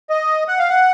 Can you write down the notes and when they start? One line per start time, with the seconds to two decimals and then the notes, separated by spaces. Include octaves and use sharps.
0.10 D#5
0.48 F#5
0.59 F5
0.70 F#5